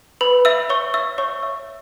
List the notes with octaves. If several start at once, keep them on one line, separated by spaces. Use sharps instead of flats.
B4 B5
E5 E6
C#5 C#6
E5 E6
C#5 C#6
E5 E6